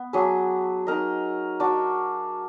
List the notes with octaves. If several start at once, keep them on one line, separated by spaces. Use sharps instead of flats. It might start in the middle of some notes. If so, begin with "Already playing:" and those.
Already playing: B3
F#3 D4 G#4 B4
D#4 A#4 D#5
D4 F#4 D5